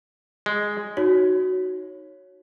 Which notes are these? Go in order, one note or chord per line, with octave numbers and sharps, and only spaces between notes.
G#3
D#4 F#4 C#5